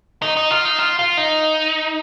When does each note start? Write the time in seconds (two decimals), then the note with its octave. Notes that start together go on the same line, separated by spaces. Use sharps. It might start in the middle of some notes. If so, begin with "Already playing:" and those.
0.22 D#4
0.37 D#4
0.51 F4
0.65 D#4
0.79 F4
0.99 F4
1.17 D#4